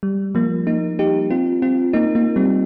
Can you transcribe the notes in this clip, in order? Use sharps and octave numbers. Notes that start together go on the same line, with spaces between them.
G3
F3 A#3
A#3 D#4
D#4 G4
C4 F4
C4 F4
A#3 D#4
A#3 D#4
G3 C4